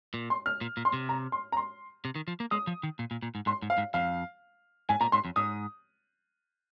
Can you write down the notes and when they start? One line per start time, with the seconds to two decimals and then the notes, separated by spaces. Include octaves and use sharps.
0.14 A#2
0.30 C6
0.46 F6
0.61 A#2
0.77 A#2
0.85 C6
0.93 C3
1.09 A#5
1.32 C6
1.52 A#5
1.57 C6
2.05 C3
2.15 D#3
2.28 F3
2.40 A#3
2.51 G#3 D#6
2.67 F3
2.83 D#3
2.99 A#2
3.11 A#2
3.22 A#2
3.35 G#2
3.46 G#2 C6
3.62 G#2
3.70 F5
3.78 G#2
3.94 F2 F5
4.89 G#2 G#5
5.01 A#2 A#5
5.12 G#2 C6
5.25 F2
5.36 G#2 D#6